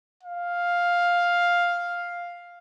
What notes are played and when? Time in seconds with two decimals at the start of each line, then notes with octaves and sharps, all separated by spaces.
0.24 F5